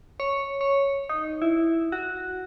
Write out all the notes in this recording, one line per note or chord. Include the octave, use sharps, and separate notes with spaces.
C#5
C#5
D#4
E4
F#4